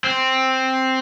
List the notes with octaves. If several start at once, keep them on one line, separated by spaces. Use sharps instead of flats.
C4